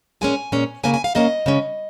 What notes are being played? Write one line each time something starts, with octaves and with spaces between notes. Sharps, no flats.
A#2 G#3 C#4 G#5
A#2 G#3 C#4
C#3 A#3 C#4 G#5
G#5
F5
C#3 A#3 C#4 D#5
C#3 G#3 C#4